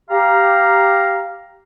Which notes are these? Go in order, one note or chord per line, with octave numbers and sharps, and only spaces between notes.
G4 F5 A#5